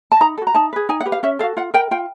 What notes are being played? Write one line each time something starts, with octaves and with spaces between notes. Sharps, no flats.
A5
D#4 A#5
A4
F#4
A#5
D#4 A5
G#4 B4
D#4 G#5
F#5
G4 B4
F5
C#4 E5
F#4 A4 F5
F4 F#5
A#4 G5
F4 G5